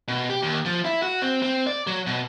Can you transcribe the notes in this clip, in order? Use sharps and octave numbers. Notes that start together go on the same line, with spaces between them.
B2
G4
D#2
F3
E4
F#4
C4
C4
D5
F#3
B2